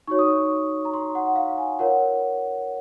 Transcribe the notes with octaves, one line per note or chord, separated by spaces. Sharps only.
D#4 F#4 C#5 C#6
D#6
C#6
A#5
C6
F#5
F5
G#5
F4 A#4 C#5 F#5